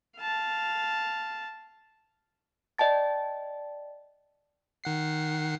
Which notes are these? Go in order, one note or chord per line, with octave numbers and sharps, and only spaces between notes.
F5 A5
D5 D#5 G5 A5 A6
D#3 F#5 C7